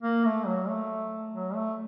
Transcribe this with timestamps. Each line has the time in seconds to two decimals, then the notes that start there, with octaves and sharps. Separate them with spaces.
0.03 A#3
0.25 A3
0.46 F#3
0.69 A3
1.33 F#3
1.55 A3